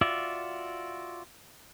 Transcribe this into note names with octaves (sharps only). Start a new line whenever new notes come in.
F4 F#4 D5 E5